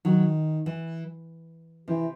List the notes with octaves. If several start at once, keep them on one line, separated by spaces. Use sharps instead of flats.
D#3 F#3
E3
C3 E3